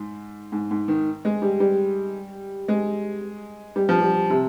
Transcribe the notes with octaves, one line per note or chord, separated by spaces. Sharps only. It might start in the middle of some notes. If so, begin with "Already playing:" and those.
Already playing: G#2
G#2
G#2
D#3
G#3
G3
G3
G#3
G3
F3
G3
C3